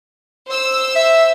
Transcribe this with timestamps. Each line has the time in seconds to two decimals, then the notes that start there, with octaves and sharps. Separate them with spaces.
0.47 C5 E6
0.96 E5